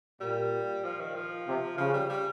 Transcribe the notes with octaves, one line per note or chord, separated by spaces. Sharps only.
A#2 G3
F3
D#3
F3
C3
C#3 F3
G3
G3